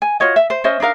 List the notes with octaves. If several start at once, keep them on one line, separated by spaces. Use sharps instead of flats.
G#5
F4 F#4 C#5 D#5
E5
C5
C#4 C5 D#5 E5
D4 D#4 A#4 F5